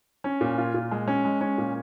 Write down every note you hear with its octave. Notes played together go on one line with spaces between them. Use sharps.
C#4
A#2
F4
A#2
G#3
C#4
G#3
C#4
A#2